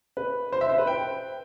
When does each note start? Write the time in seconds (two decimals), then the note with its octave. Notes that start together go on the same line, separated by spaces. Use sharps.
0.17 B4
0.52 C5
0.61 E5
0.69 C5
0.78 B4
0.87 G5